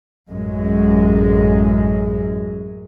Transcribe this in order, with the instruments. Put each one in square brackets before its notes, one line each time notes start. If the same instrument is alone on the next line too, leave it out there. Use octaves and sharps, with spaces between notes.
[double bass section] A1 F#2 G#3